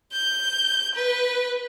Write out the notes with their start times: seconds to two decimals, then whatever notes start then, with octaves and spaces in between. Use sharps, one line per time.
0.13 G6
0.95 B4